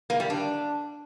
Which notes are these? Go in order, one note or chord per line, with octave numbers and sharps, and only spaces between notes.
A#3
G3
D4